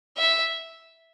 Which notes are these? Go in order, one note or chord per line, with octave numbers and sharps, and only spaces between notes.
E5